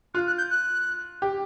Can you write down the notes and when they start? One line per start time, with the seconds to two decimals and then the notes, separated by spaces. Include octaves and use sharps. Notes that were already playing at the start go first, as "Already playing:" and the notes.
0.14 F4 F#6
0.27 F#6
0.38 G6
0.51 F#6
1.22 G4